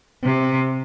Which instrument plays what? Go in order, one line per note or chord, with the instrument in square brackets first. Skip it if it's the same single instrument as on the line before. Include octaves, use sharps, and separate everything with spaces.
[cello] C3